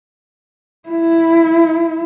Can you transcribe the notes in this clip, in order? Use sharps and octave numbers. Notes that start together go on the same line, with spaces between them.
E4